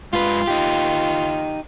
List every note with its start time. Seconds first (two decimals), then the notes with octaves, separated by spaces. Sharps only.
0.13 G#2 F4 B4
0.47 D#4 G4